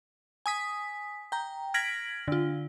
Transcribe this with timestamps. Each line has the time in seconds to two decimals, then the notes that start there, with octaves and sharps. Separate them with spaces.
0.46 G#5 D#6 B6
1.32 G5 A#5
1.74 F6 G#6 A#6 B6 D7 F#7
2.28 D3 F4